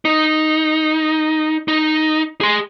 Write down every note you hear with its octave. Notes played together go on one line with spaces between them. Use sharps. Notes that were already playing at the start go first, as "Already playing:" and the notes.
D#4
D#4
G#4 C6